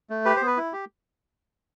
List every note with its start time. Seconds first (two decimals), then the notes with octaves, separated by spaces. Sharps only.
0.10 A3
0.25 G4 B4
0.36 C5
0.42 B3
0.47 B4
0.57 E4
0.73 G4